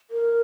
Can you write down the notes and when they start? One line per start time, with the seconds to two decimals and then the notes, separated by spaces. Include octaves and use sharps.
0.11 A#4